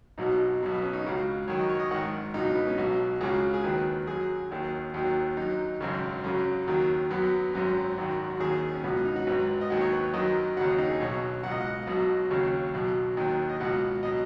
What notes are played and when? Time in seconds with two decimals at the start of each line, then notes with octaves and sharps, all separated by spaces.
0.18 B1 B2 F#3 D#4
0.61 B1 B2 F#3
0.71 B3
0.82 C#4
0.93 D#4
1.04 C#2 C#3 F#3
1.48 F#2 D#3 F#3 C#5
1.59 D#5
1.69 C#5
1.80 D#5
1.91 G#1 G#2 D#3 F#5
2.34 C#2 B2 F#3 D#4
2.45 D#4
2.55 B3
2.67 C#4
2.78 B1 B2 F#3
3.21 C#2 C#3 F#3 G#4
3.54 G#4
3.64 D#2 D#3 F#3 B4
4.07 F#2 F#3 G#4
4.51 D#2 D#3 F#3
4.94 D#2 D#3 F#3
5.37 F#2 F#3 D#4
5.80 G#1 F#2 C#3
6.24 F#2 C#3 F#3 C#4
6.67 D#2 D#3 F#3
7.11 F#2 F#3 B3
7.54 G#1 F#2 F#3 C#4
7.97 G#1 F#2 D#3 F#4
8.30 F#4
8.40 D#2 D#3 F#3 G#4
8.74 C#4
8.84 C#2 B2 F#3 B3
8.94 C#4
9.05 D#4
9.16 F#4
9.27 G#1 G#2 F#3 B4
9.61 D#5
9.70 D#2 D#3 F#3 F#5
9.81 C#5
9.92 B4
10.14 F#2 D#3 F#3 D#5
10.57 D#2 C#3 F#3 F#5
10.68 D#5
10.78 D#4
10.90 G#4
11.00 B1 B2 F#3 C#5
11.43 C#2 B2 F#3 F#5
11.51 D#5
11.61 F#5
11.87 B1 B2 F#3 D#5
12.30 D#2 C#3 F#3 C#5
12.73 B1 B2 F#3
13.17 D#2 D#3 F#3
13.49 D#5
13.60 C#2 B2 F#3 F#5
14.03 B2 F#3 D#5